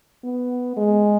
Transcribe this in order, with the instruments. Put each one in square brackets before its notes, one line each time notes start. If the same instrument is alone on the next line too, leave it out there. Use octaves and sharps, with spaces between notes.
[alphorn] B3
G#3